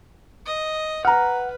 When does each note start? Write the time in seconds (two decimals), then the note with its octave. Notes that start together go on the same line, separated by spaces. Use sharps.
0.46 D#5
1.05 B4 F#5 A#5 F6